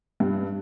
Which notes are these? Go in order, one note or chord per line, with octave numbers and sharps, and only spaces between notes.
G2